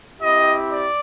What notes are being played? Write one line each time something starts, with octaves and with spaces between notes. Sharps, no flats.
C4 E4 G4 D#5
D5